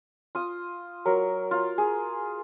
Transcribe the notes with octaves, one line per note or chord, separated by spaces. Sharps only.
F4 D#6
F#3 A#4
F4
G#4